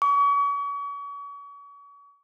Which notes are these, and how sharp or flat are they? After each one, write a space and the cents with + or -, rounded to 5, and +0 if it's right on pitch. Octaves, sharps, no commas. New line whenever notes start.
C#6 +40